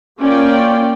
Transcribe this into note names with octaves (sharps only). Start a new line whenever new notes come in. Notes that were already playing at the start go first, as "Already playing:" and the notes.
A#3 C#4 F4 D5 G5